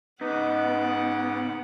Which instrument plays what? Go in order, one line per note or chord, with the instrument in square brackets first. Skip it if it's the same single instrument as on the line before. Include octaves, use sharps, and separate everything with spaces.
[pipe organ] G#2 C#3 D6 [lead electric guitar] B3 [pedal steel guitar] D#4 [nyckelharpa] F#5